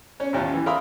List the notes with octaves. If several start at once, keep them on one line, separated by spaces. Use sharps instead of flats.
C#4 C#5
A1 D#2 C#4 F4 A5
E3
A#4 E5 F5 B5 C6 D#6